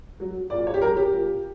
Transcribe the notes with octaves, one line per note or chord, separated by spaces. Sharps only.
F#3
A#2 D5
C#5
G4
F#3 A#4
G4
A#2